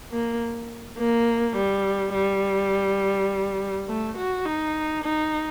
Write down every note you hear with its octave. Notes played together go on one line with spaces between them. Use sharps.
A#3
A#3
G3
G3
A3
F#4
D#4
D#4